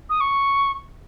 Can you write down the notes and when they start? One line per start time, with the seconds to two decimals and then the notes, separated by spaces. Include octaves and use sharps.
0.10 D#6
0.21 C#6